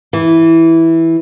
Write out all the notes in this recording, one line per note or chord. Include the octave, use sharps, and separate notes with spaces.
E3